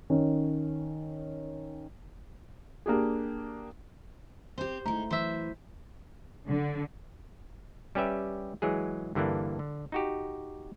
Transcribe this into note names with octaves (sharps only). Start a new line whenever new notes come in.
D#3 C#4
A#3 D4 G4 G#4
C4 G4 C5
G#3 A3 D#4 E4 F5 A#5
E3 F#3 C5 E5
D3
G3 C#4 G4 B4 E5
E3 F#3 G#3 G#4
G2 D3 E3 A#3 D4
D3
D#4 F#4 G4